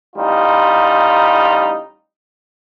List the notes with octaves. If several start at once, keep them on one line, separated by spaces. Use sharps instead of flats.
A1 G3 D#4 F4